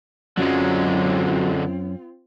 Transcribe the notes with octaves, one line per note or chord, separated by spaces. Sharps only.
F#2 D3 F#3 G#3 C4 C#4 F4